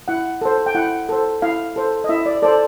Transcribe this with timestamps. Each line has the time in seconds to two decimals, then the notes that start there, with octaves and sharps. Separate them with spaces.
0.08 E4 F#5
0.41 A4 C5
0.66 G5
0.75 E4 F#5
1.09 A4 C5
1.42 E4 F5
1.76 A4 C5
2.04 D#5
2.09 E4 E5
2.26 D5
2.42 A4 C5 D5